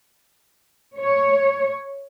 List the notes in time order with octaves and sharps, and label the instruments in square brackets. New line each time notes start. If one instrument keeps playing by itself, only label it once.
[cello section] C#5